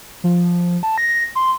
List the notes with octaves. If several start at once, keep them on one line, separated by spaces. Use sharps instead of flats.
F3
A5
A#6
C6